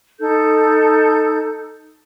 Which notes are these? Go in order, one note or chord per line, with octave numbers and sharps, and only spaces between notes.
D#4 A4 G6